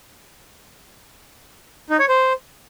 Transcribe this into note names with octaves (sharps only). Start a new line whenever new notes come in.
D#4
C#5
C5